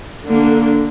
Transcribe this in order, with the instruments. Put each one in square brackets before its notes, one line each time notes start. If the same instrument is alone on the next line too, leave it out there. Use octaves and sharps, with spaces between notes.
[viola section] D3 D4 [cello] A#3